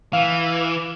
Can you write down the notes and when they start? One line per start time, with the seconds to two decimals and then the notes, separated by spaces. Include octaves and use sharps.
0.13 E3 F5